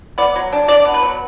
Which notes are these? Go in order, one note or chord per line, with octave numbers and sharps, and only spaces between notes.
B3 D5
F#3
D4
D4 D5
B3
B4
F#3